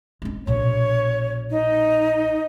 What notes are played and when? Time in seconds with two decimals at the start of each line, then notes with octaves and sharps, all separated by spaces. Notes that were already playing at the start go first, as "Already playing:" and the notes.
0.22 G#3 C4
0.47 A#1 B2 C#5
1.51 D#4